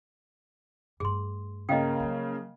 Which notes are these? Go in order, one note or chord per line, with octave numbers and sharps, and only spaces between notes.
G2 A3 G#4 C6
C#3 A#3 D#5 F5 G5
F3 F#3